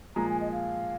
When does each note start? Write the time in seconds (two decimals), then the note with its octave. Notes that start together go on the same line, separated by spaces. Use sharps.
0.16 A#2 F3 G#3 A#5
0.29 G#5
0.40 D#5
0.52 F5